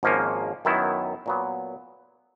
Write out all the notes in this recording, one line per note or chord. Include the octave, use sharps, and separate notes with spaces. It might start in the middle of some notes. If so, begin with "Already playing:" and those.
G#1 G#2 F3 A#3 C#4
F#2 D#3 F#3 B3 E4
A#2 F#3 B3